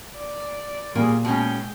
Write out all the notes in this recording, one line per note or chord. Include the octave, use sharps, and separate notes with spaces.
D5
A#2 G3 A#3 G#4
B2 G#3 C#4 G5